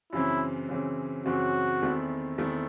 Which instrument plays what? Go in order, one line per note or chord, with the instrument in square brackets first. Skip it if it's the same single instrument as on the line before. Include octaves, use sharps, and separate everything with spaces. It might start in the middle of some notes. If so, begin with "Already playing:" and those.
[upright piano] F#2 C#3 E3 C4 [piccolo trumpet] E4
[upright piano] F#2 C#3 E3 C4
[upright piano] F#2 C#3 E3 C4 [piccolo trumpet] F#4
[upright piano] E2 D#3 A3 C4 E4
E2 D#3 A3 C4 E4